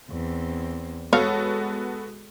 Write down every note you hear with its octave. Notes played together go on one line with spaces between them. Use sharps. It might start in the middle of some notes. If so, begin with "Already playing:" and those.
E2 C4
G#3 B3 F#4 A4 C#5 F5